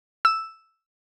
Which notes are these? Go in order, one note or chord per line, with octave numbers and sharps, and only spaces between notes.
E6